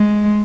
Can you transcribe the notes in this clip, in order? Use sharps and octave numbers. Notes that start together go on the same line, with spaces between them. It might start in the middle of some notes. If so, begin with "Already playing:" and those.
Already playing: G#3